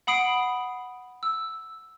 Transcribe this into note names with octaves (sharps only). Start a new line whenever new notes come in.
F#5 B5 D#6 C7 D7
E6